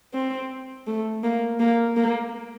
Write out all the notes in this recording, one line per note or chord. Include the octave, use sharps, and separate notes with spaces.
C4
A3
A#3
A#3
A#3